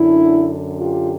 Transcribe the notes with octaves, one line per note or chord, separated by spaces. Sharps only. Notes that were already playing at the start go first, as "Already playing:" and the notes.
Already playing: F#2 D3 D4 E4
F4 G4